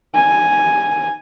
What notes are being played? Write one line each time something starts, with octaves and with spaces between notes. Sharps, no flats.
G#5